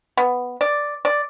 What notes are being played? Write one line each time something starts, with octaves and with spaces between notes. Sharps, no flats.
B3
D5
D5